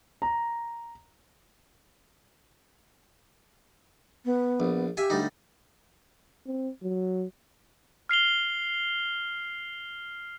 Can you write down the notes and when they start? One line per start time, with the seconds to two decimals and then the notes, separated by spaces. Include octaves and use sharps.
0.22 A#5
4.25 B3
4.60 A#1
4.97 G4 E5 F5 G#5
5.10 D2 G3 D#4
6.47 C4
6.83 F#3
8.09 F6 C7 F7 G7